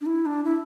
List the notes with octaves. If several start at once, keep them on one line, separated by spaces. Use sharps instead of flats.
D4
E4
D4
E4